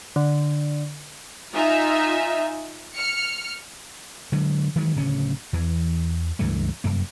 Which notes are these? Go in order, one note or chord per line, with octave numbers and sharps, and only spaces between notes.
D3
D#4 F4 E5 G#5
F6 C#7
D3 F#3 G#3
D#3 E3 F#3 G#3
D1 D2 C#3 C#4
E2 E3
C#2 G2 E3 A3
F1 F#2 A#3